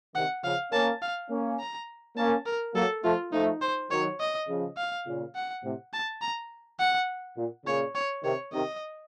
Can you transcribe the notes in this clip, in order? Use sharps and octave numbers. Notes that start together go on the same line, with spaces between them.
C3 D#3 F#5
C#3 F3 F5
A#3 C#4 A5
F5
A#3 C#4
A#5
A#3 C#4 A5
A#4
F#3 A#3 A4
F3 A3 F4
F3 A3 D#4
C5
D#3 F#3 C#5
D#5
C#3 F3
F5
A#2 C#3
F#5
A2 C3
A5
A#5
F#5
A#2
A#2 C#3 C#5
C#5
C3 D#3 C#5
C3 D#3 D#5